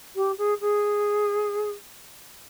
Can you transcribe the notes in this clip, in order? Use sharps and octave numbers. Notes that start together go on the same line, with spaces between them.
G4
G#4
G#4